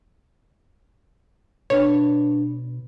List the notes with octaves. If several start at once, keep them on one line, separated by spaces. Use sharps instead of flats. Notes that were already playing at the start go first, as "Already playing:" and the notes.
B2 D4 B4 C#5